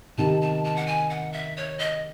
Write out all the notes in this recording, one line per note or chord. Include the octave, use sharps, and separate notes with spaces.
C3 D#3 A5
A5
A5
F#5
G#5
F#5
E5
C#5
D#5